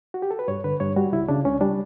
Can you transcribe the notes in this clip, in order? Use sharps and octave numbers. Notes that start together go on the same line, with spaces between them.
F#4
G4
A4
B4
G2 C#5
D3 B4
G2 C#5
G3 F#4
C#2 E4
C#3 D4
C#2 C#4
G3 D4